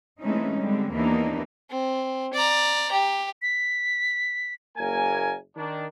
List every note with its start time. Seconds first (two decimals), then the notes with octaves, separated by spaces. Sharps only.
0.21 E3 G#3 A3 C4 C#4 D#4
0.61 D3 G3 G#3 C4
0.95 D#2 E3 A#3 B3 D4 D#4
1.70 C4
2.34 D5 A#5
2.92 G4
3.42 B6
4.77 F#1 A#3 A#4 G#5
5.56 D#3 D4